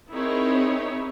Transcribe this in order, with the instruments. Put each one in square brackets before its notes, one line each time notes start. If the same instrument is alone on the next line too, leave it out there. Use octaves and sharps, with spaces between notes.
[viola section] C4 D#4 E4 G#4 A#4 C#5